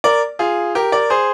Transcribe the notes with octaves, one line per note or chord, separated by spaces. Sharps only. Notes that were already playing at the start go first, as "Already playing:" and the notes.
A#4 D5
F4 G#4
G4 A#4
A#4 D5
G#4 C5